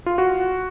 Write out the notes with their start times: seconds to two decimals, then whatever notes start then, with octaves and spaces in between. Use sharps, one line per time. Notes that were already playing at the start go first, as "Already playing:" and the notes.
0.06 F4
0.18 F#4